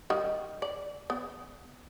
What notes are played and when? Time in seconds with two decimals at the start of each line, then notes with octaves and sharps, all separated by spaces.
0.10 D#3 G3
0.62 D5
1.10 B3